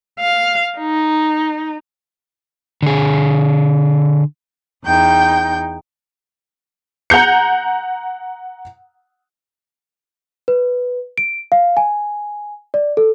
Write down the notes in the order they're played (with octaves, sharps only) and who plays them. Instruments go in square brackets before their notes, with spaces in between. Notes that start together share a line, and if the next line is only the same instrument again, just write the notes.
[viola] F5
D#4
[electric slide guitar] D3 G#4
[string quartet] E2 D#4 G5 G6
[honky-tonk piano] F#5 A#5 G6 C#7
[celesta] B4
D7
F5
G#5
D5
A4